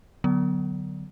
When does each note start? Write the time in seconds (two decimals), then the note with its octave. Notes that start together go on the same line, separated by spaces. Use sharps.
0.24 D3 F#3 B3